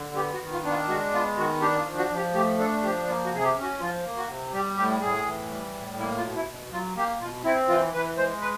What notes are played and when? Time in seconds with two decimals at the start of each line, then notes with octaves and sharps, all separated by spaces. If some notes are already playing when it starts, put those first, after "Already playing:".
Already playing: D3
0.15 B3 G4
0.34 F#4
0.40 D#3
0.52 F4
0.64 D4
0.70 F4
0.88 G#3 F#4
1.13 B3 F4
1.38 D#3 F#4
1.61 D4 G4
1.79 F4
1.85 F3
1.98 F#4
2.09 F3
2.16 G4
2.34 A3 G4
2.58 D4 A4
2.83 F3 G4
3.07 A#3 F4
3.25 F#4
3.32 C3 G#4
3.44 G4
3.56 C#4
3.62 F#4
3.80 F3 F4
4.04 A#3
4.17 F#4
4.28 C3
4.53 G3 G4
4.77 A2 G4
5.01 A2 G#4
5.26 E3
5.51 G3
5.75 A2
5.98 A#3 E4
6.18 F4
6.24 B2
6.35 E4
6.47 B2
6.72 F#3 F4
6.96 A#3 G4
7.20 B2 F4
7.44 C4 E4
7.68 E3 F4
7.94 E3 B4
8.17 G#3 C5
8.41 B4